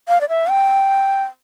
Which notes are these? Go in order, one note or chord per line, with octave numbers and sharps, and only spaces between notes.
F5
D5
E5
G5